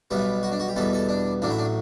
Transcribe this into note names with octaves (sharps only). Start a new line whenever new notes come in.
B1 B2 G3 B3 E4
F#4
D4
F#4
G4
E2 B2 G3 B3 A4
A4
D4
A1 A2 F#3 D4
E4
D4